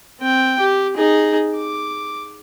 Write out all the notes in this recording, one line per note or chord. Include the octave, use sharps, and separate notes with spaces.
C4 G5
G4
D#4 G#4
D6